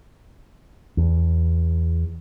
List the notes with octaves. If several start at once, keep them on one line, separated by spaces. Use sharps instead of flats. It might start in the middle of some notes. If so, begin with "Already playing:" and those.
E2